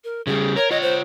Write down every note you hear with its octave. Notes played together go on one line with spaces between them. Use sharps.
A#4
C#3 F3 G3 G#4
A#4 C#5
F4 C#5 D#5
C5